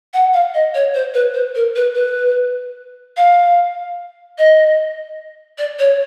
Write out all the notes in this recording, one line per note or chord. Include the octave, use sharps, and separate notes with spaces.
F#5
F5
D#5
C#5
C5
B4
C5
A#4
B4
B4
F5
D#5
D5
C#5